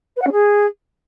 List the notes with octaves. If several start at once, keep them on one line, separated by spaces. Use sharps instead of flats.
B4
F#5
C#4
G#4